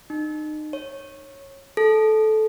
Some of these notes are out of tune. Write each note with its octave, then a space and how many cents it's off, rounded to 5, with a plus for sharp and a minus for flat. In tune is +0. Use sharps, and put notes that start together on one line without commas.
D#4 -30
C#5 -15
A4 -15